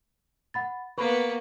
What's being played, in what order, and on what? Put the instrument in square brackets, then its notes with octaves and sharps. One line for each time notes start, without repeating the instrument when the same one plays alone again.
[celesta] F#5 B5 A6
[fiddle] A#3 B3 [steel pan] B4 [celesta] C#6